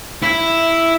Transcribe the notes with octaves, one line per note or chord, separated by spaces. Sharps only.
E4